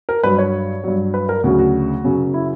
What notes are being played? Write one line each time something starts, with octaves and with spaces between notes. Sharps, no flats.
A#4
G2 F#3 B4
C#5
G2 F#3
B4
A#4
D2 C#3 F#3 F#4
F#4
F#2 C#3 F#3
E4